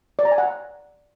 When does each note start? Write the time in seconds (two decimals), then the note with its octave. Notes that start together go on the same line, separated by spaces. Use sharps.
0.19 D5
0.25 A#5
0.32 G#5
0.38 F#5